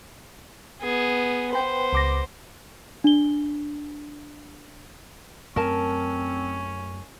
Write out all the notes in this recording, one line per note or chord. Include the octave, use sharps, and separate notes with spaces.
B3 G#4
B3 B4 C5 G5
C#2 D6 A#6
D4 G7
F#2 A3 C4 C#4 A#4 A5